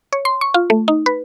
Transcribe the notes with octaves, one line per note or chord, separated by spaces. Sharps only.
C#5
C6
C#6
F4
A3
D#4
B4